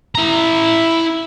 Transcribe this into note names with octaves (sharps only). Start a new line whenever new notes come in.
E4 A#5